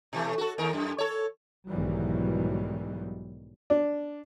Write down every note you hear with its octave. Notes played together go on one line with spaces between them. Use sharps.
B2 E3 A3
F#4 A4
D#2 A#4
F#2
A4 C#5
B1 G#2 D#3 E3 F#3 G3
D4